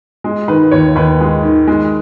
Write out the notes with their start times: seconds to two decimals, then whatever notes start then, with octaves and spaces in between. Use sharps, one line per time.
0.24 G#3
0.48 D#3 B4
0.71 D#2 C#5
0.95 D#2 B4
1.21 G#3
1.44 D#3
1.68 G#3